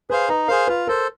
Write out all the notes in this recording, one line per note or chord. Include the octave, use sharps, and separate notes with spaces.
G#4 B4 C5 F5
D#4 B4
G#4 A#4 C5 F5
F4 B4
A4 A#4 C5